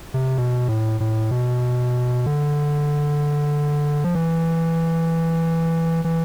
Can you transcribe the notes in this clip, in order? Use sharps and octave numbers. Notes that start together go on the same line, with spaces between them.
C3
B2
A2
A2
B2
D3
F3
E3
E3